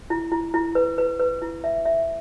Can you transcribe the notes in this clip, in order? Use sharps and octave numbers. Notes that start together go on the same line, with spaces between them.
E4
E4
E4
B4
B4
B4
E4
E5
E5